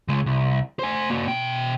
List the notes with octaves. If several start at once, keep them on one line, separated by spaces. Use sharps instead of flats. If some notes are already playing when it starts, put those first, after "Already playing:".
C#3 G#3
C2
C5 G#5
A#3 F#4
B2 G5